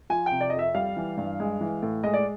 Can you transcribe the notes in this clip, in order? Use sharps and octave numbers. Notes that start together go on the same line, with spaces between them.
F3 G#5
C3 G5
D5
F2 D#5
E5
G3 F5
E3
G2
G#3
E3
A2
G#3 D#5
D5